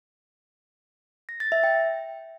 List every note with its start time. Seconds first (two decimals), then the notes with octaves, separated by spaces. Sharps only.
1.29 A#6
1.40 A6
1.52 E5
1.64 G5